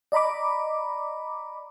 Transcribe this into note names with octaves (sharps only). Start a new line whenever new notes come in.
D5 D#5 A#5 B5 D6